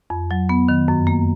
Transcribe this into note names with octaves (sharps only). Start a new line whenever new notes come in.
F2
F#3
B3
D#3
F#2
A#3